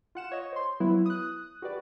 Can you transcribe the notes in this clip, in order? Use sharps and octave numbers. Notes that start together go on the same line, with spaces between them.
F4 F#5 E7
C#5 D#5
C5 C6
F#3 B3 E4 B4
D#6 F#6
F#4 G4 B4 D5